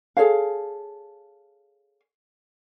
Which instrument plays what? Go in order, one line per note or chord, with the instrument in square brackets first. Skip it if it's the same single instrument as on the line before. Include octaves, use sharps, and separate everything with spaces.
[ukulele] G#4 A4 C#5 F5